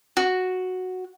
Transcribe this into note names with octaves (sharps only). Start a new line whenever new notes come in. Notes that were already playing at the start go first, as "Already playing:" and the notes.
F#4